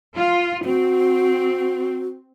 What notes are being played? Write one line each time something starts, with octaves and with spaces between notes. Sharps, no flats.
F4
C4 F#4